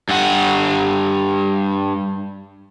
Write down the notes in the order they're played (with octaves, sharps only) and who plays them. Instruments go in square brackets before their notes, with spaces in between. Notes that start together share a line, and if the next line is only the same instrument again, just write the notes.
[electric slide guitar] G2 F#5